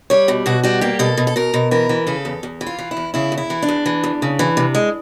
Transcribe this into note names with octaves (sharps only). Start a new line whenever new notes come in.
G3 C#5
B2
B2 F#4
G3 F#4
A#3 G4
B2 A4
B2
A4
B2 A#4
B2
E3 A#4
E3
C#3 A4
E2
E2
E3
F4
E3
E4
E2
C#3 E4
E2
E4
E3
D4
E2
E3
E2
C#3
E3
C3
G#3